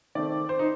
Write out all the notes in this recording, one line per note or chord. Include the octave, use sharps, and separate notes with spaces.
D#3 A3 C4 D5
C5
D#4